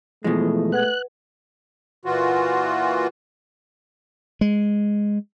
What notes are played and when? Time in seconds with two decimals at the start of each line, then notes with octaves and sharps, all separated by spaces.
0.24 B2 E3 F3 G#3 A3
0.72 B4 F#5 F#6 G#6
2.05 A#2 E3 F4 F#4
4.41 G#3